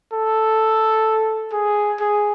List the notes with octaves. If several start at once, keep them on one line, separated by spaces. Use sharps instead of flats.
A4
G#4
G#4